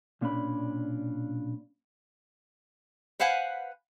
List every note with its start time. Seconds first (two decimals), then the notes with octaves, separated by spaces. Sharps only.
0.21 B1 A#2 C#4 D4 B5
3.20 B4 C5 F5 F#5 G#5